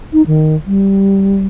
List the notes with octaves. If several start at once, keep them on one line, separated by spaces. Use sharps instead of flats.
D#4
D#3
G3